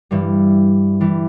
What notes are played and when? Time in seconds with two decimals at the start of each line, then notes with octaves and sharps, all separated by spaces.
0.11 G2 E3 G3
1.01 E3 G3